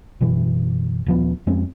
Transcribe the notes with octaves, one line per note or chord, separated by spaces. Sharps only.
F#1 B2 E3
D#1 F3 B3
F2 G#3 C4 C#4